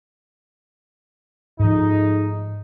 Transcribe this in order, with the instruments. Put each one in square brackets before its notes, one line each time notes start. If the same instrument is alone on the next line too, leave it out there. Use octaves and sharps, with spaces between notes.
[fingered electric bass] G#2 F3 [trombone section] G#3 A3 D#4